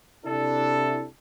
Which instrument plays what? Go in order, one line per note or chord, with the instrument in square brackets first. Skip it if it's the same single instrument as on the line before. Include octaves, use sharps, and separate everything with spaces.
[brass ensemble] C3 D4 E4 A4